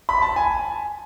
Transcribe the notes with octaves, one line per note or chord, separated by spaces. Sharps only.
B5
A5
G#5